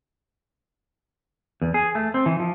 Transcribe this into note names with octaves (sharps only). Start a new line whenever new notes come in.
E2
G#4
A3
C4
E3
F3